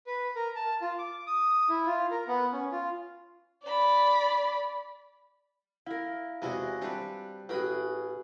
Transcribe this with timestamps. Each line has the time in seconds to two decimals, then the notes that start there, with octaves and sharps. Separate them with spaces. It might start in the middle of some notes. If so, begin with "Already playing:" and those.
0.07 B4
0.36 A#4
0.56 A5
0.81 F4
0.98 D6
1.27 D#6
1.69 E4
1.86 F4
2.11 A#4
2.28 B3
2.52 C#4
2.72 F4
3.64 D5 B5
5.86 E4 A#4 F5
6.42 E2 C3 G#3 E4 F#4 G#4
6.82 G3 C4 D4 B4
7.49 A1 F#4 G#4 B4 G5 B5